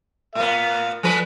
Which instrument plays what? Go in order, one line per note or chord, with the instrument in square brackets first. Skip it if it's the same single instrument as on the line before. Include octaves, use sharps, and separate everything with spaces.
[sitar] A2 B3 [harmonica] A#4 F5
[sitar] F3 A3 B4